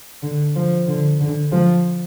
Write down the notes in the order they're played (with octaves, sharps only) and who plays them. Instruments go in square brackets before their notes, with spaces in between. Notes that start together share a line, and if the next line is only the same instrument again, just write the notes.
[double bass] D3
F3
D3
D3
F3